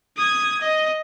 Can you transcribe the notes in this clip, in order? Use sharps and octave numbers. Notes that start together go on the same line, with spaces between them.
D#6 G#6
D#5